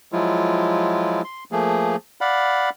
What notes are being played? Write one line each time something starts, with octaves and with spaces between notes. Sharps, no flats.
F3 F#3 G#3 E4 F4
C6
F3 A3 A#3 G#4
D5 F5 F#5 B5